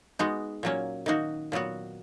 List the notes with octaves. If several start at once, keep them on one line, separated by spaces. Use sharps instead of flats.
G#3 B3 D#4 F#4
A#2 F#3 A#3 C#4
D#3 A#3 D#4 F#4
A#2 F#3 B3 F#4